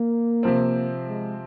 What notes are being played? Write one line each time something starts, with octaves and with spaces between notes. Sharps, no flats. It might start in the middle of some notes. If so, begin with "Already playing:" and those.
Already playing: A#3
C3 F3 C4
G#3